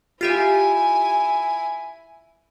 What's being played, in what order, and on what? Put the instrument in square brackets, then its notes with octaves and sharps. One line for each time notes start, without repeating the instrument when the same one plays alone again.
[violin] E4 G#5 [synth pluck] F4 G4 E5